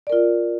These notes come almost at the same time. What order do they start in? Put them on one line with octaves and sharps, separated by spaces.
D5 A#4 F4